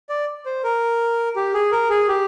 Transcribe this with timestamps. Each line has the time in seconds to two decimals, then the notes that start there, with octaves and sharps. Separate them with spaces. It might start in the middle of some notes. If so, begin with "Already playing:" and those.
0.09 D5
0.46 C5
0.64 A#4
1.36 G4
1.54 G#4
1.72 A#4
1.90 G#4
2.08 G4